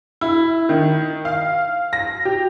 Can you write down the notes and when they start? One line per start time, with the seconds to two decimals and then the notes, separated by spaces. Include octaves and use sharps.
0.21 E4
0.69 D#3
1.25 F5
1.93 A#6
2.25 G4